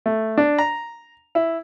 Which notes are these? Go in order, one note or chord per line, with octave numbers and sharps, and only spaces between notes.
A3
D4
A#5
E4